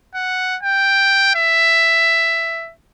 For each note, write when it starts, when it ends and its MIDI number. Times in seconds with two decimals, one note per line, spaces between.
0.15 0.57 78
0.63 1.33 79
1.35 2.72 76